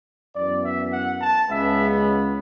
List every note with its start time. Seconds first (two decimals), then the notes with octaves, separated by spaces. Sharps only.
0.36 F#2 E3 B3 D5
0.64 E5
0.92 F#5
1.21 A5
1.49 C#2 C#3 G#3 B3 E5